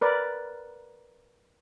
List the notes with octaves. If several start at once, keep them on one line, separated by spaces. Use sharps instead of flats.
A#4 B4 D5